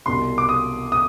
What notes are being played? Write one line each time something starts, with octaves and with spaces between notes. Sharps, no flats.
C2 B2 C6
D6
D#6
D#6